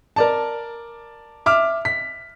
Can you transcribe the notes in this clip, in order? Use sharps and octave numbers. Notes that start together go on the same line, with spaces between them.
A#4 D5 A5
E5 D6 F6
B6